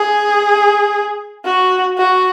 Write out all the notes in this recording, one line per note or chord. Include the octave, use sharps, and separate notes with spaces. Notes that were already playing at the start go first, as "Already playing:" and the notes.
Already playing: G#4
F#4
F#4